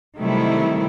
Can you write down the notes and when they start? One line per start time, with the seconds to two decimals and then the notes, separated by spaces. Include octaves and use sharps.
0.18 C3 D#3 F#3 G3 A3 E4